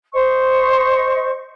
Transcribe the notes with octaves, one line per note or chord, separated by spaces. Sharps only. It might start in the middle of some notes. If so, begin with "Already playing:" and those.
C5 D#5 C#6